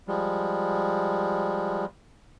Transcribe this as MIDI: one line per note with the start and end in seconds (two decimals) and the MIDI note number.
0.08 1.85 53
0.08 1.85 55
0.08 1.85 56